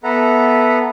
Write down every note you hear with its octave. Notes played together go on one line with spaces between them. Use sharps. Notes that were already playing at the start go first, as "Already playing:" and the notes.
B3 A4 B4 E5 F#5 A#5